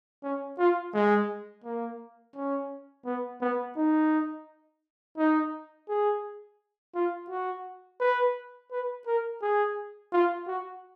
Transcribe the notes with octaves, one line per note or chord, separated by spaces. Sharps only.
C#4
F4
G#3
A#3
C#4
B3
B3
D#4
D#4
G#4
F4
F#4
B4
B4
A#4
G#4
F4
F#4